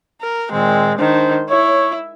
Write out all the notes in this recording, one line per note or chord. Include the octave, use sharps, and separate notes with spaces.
A#4
A#2 D#3 G#3 C4
D#3 D4 C5
E4 C#5